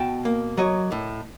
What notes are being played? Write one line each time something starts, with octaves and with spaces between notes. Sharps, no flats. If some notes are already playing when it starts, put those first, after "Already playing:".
Already playing: B2 G5 A5
A#3
F#3 C#5 D#5
A2